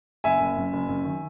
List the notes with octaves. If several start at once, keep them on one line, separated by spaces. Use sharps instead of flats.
F#1 E5 G#5
F#1
F#2
F#1
F#2
D#3